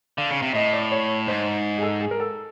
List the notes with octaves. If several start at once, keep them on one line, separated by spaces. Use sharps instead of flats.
D3 F5
C#3
C3
A2 D#5
D5
C#5
G#2 C5
G#4
A4
G#4
A#4
A4